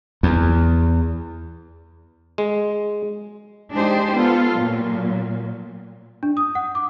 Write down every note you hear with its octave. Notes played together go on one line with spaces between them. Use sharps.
E2
G#3
G#3 D4 D#4 G4 G#4 C5
B3 F4 A4
A#2 F#3
D4
D#6
F#5
D6